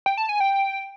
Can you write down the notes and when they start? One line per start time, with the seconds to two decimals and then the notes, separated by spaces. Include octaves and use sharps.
0.06 G5
0.18 A5
0.29 G#5
0.40 G5